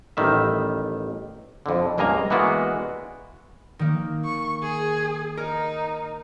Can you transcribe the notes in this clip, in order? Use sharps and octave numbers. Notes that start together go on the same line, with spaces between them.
A1 D#3 G3 E5
F2 D3
C#2 G2 A#3 D#5 G#5 A#5
E3 G#3 A#3 B3 F#4 D5
D#3 A#3
C#6
G#4
D#4 A#4